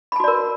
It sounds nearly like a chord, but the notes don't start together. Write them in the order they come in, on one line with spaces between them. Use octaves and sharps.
B5 A5 F#4 D5 A#4